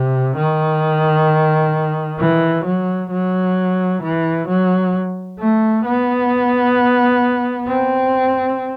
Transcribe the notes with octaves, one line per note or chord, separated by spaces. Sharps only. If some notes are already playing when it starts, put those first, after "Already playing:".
Already playing: C3
D#3
E3
F#3
F#3
E3
F#3
A3
B3
C4